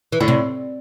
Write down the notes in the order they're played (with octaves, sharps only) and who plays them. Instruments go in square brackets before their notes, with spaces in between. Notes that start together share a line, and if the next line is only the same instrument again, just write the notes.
[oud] E3
[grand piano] A2 [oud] D3
[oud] C3